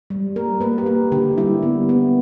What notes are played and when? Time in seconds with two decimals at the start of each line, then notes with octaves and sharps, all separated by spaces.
0.10 G3
0.36 A#3 A#4
0.61 A#3 B4
0.78 G4
0.86 A#3 A#4
1.12 D3 G4
1.38 G3 E4
1.63 B3
1.89 B3